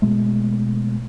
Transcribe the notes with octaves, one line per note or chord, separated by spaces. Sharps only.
B2 G#3 A3